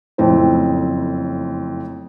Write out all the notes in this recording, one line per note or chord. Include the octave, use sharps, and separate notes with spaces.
F#1 F2 A2 C4 E4 C5